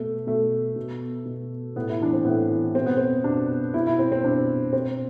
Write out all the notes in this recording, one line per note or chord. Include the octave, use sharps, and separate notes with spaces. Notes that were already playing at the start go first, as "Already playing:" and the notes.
Already playing: B2 A3
B2 A3
B2
B2
A2 B3
E4
E3 D4
C4
A2 B3
E3
B2 C4
B3
C4
B2 D4
B2 E4
E4
C4
C4
B2 D4
B2 C4